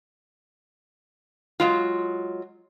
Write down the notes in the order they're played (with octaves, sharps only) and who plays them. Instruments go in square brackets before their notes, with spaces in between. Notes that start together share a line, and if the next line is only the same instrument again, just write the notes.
[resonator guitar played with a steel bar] F#3 G#3 F4